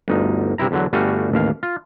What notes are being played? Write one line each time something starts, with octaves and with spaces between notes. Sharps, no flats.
G1 D2 D#4
G2 C3 C4 E4 A#5
E2 D3 F#3
G1 G3 A3 F#4 F5 G#5
A1 D#2 F5
F4